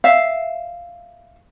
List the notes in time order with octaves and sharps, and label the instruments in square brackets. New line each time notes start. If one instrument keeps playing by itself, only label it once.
[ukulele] E5 F5